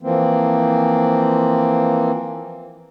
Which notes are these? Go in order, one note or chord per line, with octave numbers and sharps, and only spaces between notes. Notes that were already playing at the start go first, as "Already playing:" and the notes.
E3 F3 A#3 C4